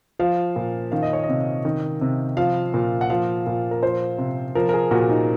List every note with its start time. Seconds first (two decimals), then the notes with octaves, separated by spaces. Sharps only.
0.19 F3 F5
0.56 A#2
0.92 D#3 F5
1.03 D#5
1.13 C#5
1.24 D#5
1.29 C3
1.65 D#3
2.01 C3
2.37 F3 F5
2.74 A#2
3.01 F#5
3.10 F3 F5
3.47 A#2
3.71 A#4
3.83 F3 C5
4.18 C3
4.55 F3 A#4
4.69 A#4
4.73 G#4
4.91 A#2 F#4
5.09 D#4